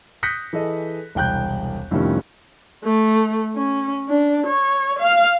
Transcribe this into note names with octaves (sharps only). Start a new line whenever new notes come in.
D#6 F#6 G6 A#6 B6 C#7
E3 G#4 A4 D#5
E1 C2 G5 F#6 G6
F2 A2 C3 D#3 G3 C#4
A3
C#4
D4
C#5
F5